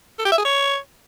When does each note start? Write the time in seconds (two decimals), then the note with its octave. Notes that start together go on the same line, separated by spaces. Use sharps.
0.19 A4
0.25 G4
0.32 E5
0.38 G#4
0.45 C#5